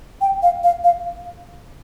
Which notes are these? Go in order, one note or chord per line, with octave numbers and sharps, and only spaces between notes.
G5
F5
F5
F5